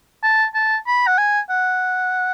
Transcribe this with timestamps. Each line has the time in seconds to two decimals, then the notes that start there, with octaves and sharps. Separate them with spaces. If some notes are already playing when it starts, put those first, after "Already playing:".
0.23 A5
0.54 A5
0.87 B5
1.07 F#5
1.18 G#5
1.50 F#5